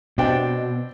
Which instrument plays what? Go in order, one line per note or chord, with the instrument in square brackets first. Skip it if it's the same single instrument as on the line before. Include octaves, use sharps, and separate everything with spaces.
[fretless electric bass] B2 [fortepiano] C4 D4 G5